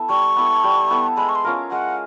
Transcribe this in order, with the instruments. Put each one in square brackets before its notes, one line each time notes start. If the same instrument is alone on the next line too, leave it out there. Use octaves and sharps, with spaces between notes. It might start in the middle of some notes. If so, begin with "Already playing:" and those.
Already playing: [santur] B3 E4 A4
[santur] G3 [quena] C#6
[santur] B3 E4 A4
G3
B3 E4 A4
[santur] G#3 [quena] B5
[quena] C#6
C6
[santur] C#4 F4 A#4
[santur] G#3 [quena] F#5